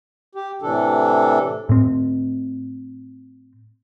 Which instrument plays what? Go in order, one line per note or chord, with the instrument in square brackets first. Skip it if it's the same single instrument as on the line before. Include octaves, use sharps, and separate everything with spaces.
[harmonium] G4
A2 C3 E3 D4 A4
[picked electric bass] A2 C4